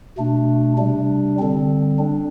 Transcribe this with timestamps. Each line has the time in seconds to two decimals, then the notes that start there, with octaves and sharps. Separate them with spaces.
0.18 B2 A3 D4
0.78 C3 G3 D4
1.39 D3 G3 C4
1.99 D4